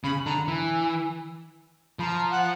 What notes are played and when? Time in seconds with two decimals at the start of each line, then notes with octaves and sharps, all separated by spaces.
0.04 C#3 B5
0.26 D3 A#5
0.48 E3
1.99 F3 B5
2.03 A#5
2.31 F#5